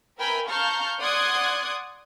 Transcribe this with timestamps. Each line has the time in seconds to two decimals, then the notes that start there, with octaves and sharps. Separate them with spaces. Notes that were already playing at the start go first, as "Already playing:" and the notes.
0.19 A#4 B4 E5 G5 G#5 B5
0.48 F5 A5 A#5 C#6 F6 G6
1.00 D5 F#5 C6 D#6 F#6 G#6